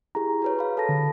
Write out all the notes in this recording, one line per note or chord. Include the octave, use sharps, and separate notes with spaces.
E4 G4 G#4 A#5
F#4 B4 C#5
F5 B5
A4 A5 A#6
D3